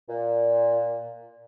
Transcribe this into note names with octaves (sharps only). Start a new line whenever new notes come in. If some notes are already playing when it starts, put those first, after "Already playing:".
A#2